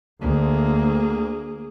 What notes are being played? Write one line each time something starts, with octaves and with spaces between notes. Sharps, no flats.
D2 A#3 G#4